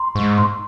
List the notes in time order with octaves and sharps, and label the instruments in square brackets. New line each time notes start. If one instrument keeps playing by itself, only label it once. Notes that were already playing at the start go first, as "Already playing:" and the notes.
Already playing: [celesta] A#5 C6
[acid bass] G#2 [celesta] C#6
[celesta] C6